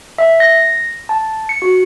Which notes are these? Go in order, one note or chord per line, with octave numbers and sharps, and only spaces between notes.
E5
A#6
A5
C#7
F#4